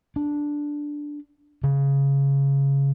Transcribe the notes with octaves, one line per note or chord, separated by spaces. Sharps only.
D4
C#3